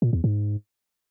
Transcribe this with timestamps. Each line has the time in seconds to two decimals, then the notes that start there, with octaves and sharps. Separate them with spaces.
0.02 A#2
0.13 E2
0.24 G#2